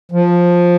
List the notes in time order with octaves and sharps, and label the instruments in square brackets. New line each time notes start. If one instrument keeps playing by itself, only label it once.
[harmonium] F3